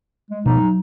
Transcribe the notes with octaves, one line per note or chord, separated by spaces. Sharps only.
G#3
B2 F3 G#3 D#4
F#3